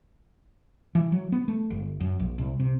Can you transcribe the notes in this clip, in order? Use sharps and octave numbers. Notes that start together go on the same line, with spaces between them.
E3
F#3
B3
A3
G1
F#2
A#1
C2
C3